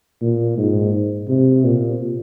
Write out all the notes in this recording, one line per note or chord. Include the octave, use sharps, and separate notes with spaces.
A#2
G#2
C3
A#2